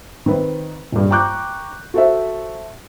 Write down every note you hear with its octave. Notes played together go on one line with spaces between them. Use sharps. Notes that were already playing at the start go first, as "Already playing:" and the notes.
D#3 C4 B4
D#1 G2
G5 A#5 C#6 D6 F#6 G6
F#4 A4 C5 E5